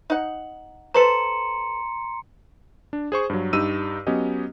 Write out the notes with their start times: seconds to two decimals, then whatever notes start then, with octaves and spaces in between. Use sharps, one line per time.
0.10 D#4 F#5
0.94 A4 B4 C5 A#5 C6 C#7
2.93 D4
3.12 G#4 C5 C#6
3.30 G2 F#3
3.53 G2 D#4 G4 E6 D#7
4.07 F#3 B3 C#4 G4 D#5